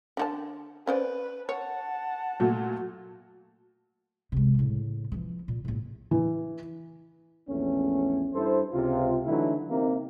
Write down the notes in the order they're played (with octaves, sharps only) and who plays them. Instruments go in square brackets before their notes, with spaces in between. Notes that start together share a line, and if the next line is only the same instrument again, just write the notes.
[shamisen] D3 F#4 A5
[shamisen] C#4 C5 D5 [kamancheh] B4
[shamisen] C#5 [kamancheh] F#5 A5
[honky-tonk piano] A#2 F#3 A3
[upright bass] C3 G#3
A2 C#3
E3 F3
A#2
A#1 A2
[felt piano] E3
[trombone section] A#1 E2 A3 C#4
G2 E4 A4 C5
C#2 C3 F4
D3 E3 F#3 A3 D#4 E4
C3 A#3 D#4